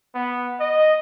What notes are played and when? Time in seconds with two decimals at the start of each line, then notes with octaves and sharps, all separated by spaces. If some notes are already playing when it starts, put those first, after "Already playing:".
0.15 B3
0.60 D#5